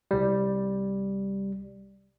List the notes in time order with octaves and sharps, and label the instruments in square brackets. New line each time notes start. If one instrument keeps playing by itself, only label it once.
[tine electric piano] C2 G3